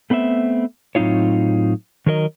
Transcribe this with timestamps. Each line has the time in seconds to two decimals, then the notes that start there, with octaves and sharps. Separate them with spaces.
0.10 A3 B3 C4 D#5 E5
0.95 A2 F#3 C4 D#4 F4 C#5
2.06 D#3 F#3 A#4 D#5